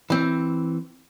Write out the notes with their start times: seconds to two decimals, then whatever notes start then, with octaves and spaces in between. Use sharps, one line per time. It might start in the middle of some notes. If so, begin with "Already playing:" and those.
0.10 E3 C4